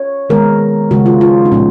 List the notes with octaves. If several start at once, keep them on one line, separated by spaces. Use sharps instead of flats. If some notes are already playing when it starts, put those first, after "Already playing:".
Already playing: C#5
D#3 G#3 B3 A#4
C#3 G#3 B3 F#4
F4
F4
D#4
A#2 F3 G#3 B3 C#4